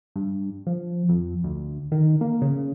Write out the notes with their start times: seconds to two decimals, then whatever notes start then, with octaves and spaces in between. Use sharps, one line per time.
0.16 G2
0.67 F3
1.09 F2
1.44 D2
1.92 D#3
2.21 A#3
2.42 C#3